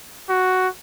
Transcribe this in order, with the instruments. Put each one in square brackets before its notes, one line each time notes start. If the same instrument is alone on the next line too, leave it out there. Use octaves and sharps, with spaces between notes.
[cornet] F#4